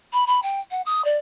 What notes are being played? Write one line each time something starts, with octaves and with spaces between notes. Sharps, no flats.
B5
B5
G5
F#5
D#6
D5